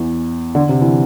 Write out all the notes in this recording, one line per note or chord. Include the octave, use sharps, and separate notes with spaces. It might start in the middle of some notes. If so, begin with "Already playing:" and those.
Already playing: E2 E3
D3
C3
E3